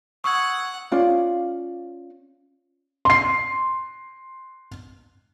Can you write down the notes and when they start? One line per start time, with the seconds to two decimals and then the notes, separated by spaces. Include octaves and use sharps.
0.24 F#5 C#6 D#6 E6 G#6
0.92 C#4 F4 D5 F5
3.05 C6 C7